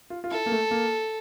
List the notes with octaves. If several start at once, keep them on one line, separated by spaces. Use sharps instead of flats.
F4
F4
E4 A4
A#3
A3
A#3